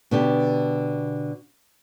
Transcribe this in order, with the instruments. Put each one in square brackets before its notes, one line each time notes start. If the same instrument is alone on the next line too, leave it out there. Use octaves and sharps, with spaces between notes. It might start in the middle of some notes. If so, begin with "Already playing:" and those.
[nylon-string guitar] B2 D3 G4